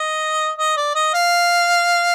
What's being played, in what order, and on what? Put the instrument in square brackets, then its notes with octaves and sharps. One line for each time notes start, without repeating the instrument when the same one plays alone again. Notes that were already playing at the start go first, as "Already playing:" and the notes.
Already playing: [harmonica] D#5
D#5
D5
D#5
F5